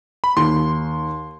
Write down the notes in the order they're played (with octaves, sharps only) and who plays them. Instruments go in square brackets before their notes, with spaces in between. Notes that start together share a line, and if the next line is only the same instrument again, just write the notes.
[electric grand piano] B5
[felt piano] D#2 [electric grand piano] C6